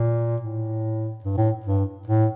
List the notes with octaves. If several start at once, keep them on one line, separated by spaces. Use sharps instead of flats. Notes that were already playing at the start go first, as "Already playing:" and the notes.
Already playing: A#2
A2
G2
A2
G2
A2